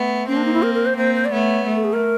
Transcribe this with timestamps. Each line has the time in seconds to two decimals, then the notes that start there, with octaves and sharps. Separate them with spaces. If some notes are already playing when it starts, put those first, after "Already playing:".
Already playing: A3 B3
0.28 A#3 C4 C#4
0.37 D4
0.45 D#4
0.54 E4
0.63 A#4
0.75 A#4
0.86 C5
0.97 A#3 C4 C5
1.15 C5
1.25 D5
1.32 A3 B3 C#5
1.66 A3
1.76 A4
1.84 G#4
1.93 A#4